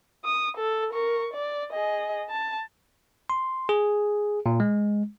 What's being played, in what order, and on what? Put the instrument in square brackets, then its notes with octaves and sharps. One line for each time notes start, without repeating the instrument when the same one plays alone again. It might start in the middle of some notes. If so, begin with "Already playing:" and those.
[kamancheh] D#6
A4
A#4 C#6
D5
G#4 D#5
A5
[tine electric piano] C6
G#4
A#2
G#3